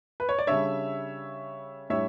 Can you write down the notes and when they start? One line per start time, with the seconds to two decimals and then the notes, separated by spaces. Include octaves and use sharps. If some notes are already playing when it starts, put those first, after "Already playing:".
0.20 B4
0.29 C#5
0.39 D5
0.47 C#3 G3 D4 C#5 E5
1.90 A2 G3 D4 C#5 E5